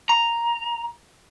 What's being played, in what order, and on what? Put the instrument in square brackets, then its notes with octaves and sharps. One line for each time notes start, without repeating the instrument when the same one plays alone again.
[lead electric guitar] A#5